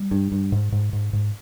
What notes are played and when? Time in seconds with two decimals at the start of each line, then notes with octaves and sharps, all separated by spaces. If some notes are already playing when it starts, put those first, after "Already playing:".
Already playing: G3
0.11 G2
0.32 G2
0.52 G#2
0.72 G#2
0.93 G#2
1.13 G#2